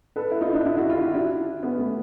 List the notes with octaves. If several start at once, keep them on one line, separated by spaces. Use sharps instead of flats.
A4 B4
E4
D#4 F4
D4 E4
D4 E4
E4 F#4
F4 G4
E4 F#4
D4 E4
B3 C#4
A3 B3